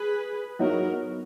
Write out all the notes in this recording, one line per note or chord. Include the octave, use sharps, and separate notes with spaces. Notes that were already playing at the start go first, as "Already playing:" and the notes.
Already playing: G#4 B4
F#3 B3 D#4 F#4 A#4